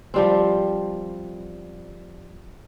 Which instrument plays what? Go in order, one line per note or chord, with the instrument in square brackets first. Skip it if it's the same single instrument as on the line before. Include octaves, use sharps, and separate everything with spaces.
[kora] F3 G3 C4